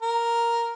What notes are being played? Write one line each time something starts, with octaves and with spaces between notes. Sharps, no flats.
A#4